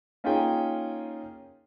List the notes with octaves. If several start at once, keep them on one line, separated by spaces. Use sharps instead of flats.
A#3 C#4 D#4 F4 G#4 G5